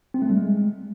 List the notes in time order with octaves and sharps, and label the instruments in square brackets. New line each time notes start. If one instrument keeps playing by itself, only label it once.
[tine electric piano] C4
A3
G3
G#3